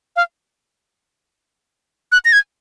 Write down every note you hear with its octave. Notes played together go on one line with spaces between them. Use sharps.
F5
F#6
A#6
G#6